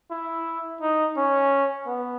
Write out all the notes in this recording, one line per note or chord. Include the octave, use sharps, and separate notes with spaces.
E4
D#4
C#4
B3